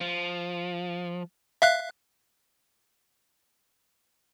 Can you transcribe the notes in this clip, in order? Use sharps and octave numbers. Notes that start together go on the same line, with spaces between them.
F3
E5 F5 F#6